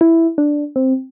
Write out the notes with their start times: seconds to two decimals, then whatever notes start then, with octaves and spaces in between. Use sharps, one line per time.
0.01 E4
0.38 D4
0.76 C4